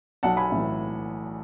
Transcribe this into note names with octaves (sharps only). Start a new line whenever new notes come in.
B1 F#5 A5
G#5 B5
A2 E3